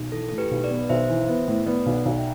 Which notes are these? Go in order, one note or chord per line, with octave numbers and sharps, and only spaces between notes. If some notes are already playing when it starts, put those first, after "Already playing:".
Already playing: B1
E3 A4
A2 A4
G4 B4
B1
B4 D5
B3
B1 C5 E5
E3
B3
A2
B3 B4 D5
B1
D5 F#5
B1
E5 G5